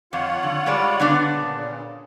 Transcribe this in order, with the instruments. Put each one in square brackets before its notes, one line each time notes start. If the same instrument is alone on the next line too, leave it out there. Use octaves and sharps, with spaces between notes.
[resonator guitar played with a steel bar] F2 [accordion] F4 C#5 F#5
[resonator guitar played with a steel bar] D3
G3 G#3 D5
D3 B3 D4
[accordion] A#2 C#3